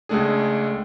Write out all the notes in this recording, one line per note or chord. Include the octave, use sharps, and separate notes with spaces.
C#2 G#3 A3 D4 G#4